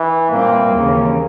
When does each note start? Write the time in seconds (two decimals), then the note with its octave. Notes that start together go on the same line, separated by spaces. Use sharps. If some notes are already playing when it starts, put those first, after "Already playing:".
Already playing: E3
0.31 A#2 G3 A#3 C4
0.72 D#2 C#3 E3